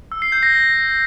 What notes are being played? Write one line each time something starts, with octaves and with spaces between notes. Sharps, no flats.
E6
C7
G6
A#6